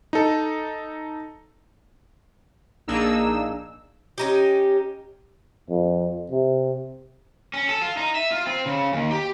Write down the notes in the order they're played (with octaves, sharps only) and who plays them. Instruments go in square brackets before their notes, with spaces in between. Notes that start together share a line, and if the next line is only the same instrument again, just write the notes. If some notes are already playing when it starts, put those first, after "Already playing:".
[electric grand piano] D#4 A4
[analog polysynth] A#1 A#3 D4 D#4 G#4 E6
[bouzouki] C#4 D#4 G4
[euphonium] F2
C3
[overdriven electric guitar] C#4
A4
F4
D#4
E5
F4
C4
C#3
D#2
G4